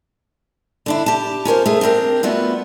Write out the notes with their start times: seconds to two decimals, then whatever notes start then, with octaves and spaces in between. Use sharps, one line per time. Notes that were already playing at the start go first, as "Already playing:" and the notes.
0.86 D3 D4 E4
1.06 G4 A5
1.45 C#4 F4 A#4 C5
1.66 A3 G#4
1.81 C4 D4 G4 A#4
2.23 G3 A3 B3 F4 F#4